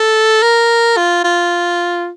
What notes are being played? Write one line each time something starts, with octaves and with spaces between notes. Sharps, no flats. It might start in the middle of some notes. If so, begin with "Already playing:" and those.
Already playing: A4
A#4
F4
F4